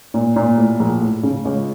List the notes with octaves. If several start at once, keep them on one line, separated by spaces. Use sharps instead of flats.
A#2
A#2
A2
A#1
A2
C#3
C#2